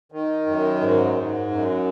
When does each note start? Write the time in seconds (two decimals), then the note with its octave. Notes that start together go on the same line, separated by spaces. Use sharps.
0.12 D#3
0.47 F#2
0.81 G#2
1.15 G#2
1.51 F#2